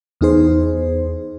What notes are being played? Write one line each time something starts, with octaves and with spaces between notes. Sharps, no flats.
E2 B3 D#4 G#4 C5